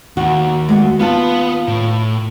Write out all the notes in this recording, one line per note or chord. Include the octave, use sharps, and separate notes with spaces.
D#2 F#4
G#3 A3 F#4
D#2 B3 F4 A5
A2